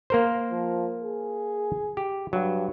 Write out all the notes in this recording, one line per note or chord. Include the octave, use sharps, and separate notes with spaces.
A#3 A#4 C5
F3
G#4
G4
G2 F#3